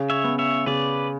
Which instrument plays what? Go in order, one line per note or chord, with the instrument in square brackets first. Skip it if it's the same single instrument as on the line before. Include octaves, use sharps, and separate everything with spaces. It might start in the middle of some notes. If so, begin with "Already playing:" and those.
Already playing: [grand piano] C#3
[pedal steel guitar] C#5 E5
[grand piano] B3
[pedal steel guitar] C#5 E5
[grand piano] C#3 [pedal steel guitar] B4 D5